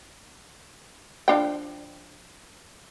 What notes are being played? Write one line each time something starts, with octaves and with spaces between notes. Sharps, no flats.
F3 D4 G5